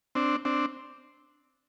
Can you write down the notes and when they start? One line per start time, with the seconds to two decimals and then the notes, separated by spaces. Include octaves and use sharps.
0.15 C4 D4
0.45 C4 D4